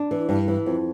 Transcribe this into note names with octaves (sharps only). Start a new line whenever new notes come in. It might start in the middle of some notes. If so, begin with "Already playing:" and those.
Already playing: D4
E3
G2
E3
F2